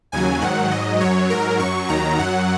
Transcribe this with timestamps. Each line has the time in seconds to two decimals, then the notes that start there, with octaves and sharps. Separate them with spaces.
0.12 D#2 C#3 F#3 G#5
0.41 G#2 D#3 F#3 F#5
0.71 G#2 F#3 D#5
1.00 F#2 F#3 C#5
1.30 G#2 F#3 A#4
1.59 F#2 F#3 C#6
1.89 D#2 D#3 F#3 A#5
2.19 F#2 F#3 F#5